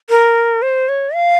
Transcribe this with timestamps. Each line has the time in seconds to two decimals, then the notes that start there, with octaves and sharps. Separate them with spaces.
0.10 A#4
0.62 C5
0.89 C#5
1.14 F5